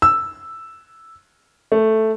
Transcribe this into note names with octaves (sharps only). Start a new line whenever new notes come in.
E6
A3